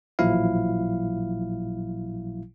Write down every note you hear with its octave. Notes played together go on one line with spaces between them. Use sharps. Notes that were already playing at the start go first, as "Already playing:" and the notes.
A1 A#2 F3 F#3 E4 F5